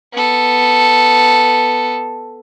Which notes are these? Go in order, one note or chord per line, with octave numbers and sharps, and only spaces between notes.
B3 A4